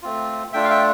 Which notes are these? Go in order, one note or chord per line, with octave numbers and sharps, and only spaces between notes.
A3 C4 F4
A3 D4 F4 E5 G5
F5
E5 G5